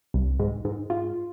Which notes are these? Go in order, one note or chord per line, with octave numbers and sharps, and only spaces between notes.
C2
G#2
G#2
F4